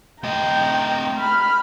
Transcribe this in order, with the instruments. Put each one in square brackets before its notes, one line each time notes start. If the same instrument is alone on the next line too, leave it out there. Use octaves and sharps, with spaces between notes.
[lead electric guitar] A3 D#5 [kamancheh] G5 A#5
[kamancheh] B5 F6